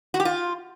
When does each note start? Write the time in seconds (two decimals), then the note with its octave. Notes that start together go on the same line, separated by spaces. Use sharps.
0.14 F#4
0.20 G4
0.25 F4